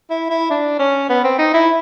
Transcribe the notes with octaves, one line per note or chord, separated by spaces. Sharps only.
E4
E4
D4
C#4
B3
C4
D#4
E4